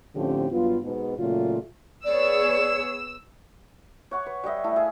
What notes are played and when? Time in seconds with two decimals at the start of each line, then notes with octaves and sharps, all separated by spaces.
0.15 A2 D3 F3 C4 C#4 G4
0.51 G2 F#3 B3 F4
0.83 G#2 B2
1.18 A#2 C#3 F#3 A3 F4
2.05 B3 G#4 C#5 D5 E6
4.11 C#5 F#5 C#6 D6
4.26 B4
4.44 G3 B4 D#5 E5
4.64 A3 E4
4.76 G#4 F5